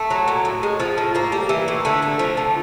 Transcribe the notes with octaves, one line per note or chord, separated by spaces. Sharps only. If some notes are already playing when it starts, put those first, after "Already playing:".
Already playing: A3
F#3
A#2
A2
G#3
F3
A2
A2 A#3
G3
E3
A2
D3 A3
A3
F3
D3